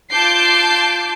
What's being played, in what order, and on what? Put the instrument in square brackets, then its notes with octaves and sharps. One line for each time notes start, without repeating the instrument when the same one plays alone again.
[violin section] F4 A5 D6 G6 C7